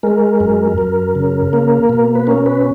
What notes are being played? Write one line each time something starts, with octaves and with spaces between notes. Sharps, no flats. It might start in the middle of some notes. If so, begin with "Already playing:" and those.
G#3 A#4
F#2
F#2
C#3
A#3
B2
B4
C#4 A#4
B4